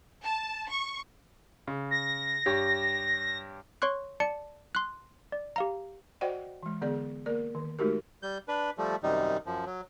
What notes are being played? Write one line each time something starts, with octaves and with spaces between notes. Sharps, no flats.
A5
C#6
C#3
A#6
G2 G4 C#5
C#5 C6 C#6 F#6
D5 A5 C#7
C6 F#6
D5
G4 F5 A#5
F#4 C5 D5 D#5 F#5 G5
E3 G#3
D3 B3 G#4 D5
A#3 A#4 D5
D#3
G#3 A3 D#4 F#4 G4 A#4
G3 G6
D4 B4
F3 G3 A3
F#2 C3 D#3 G3 D#4
F#2 F3
F#3